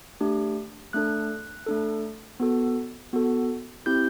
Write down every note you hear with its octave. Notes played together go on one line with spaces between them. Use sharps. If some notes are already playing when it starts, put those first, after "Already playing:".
A3 D4 G4
A3 D4 A4 F#6
A3 D4 A4
B3 F#4 A4
B3 F#4 A4
C4 E4 G4 G6